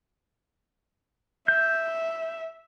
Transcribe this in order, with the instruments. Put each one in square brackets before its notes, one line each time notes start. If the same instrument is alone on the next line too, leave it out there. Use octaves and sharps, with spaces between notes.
[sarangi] E5 [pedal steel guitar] G6